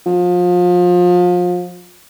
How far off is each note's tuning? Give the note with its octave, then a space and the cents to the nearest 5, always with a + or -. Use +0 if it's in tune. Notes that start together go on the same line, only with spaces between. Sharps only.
F3 +30